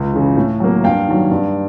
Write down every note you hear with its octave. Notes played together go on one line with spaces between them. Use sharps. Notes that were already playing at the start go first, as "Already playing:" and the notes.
Already playing: C#2
C#3 E3
A2
F#3 A#3
G2 F5 G5
D#3 F#3
G2